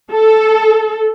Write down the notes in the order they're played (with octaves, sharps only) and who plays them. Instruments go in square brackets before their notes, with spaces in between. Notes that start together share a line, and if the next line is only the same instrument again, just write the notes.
[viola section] A4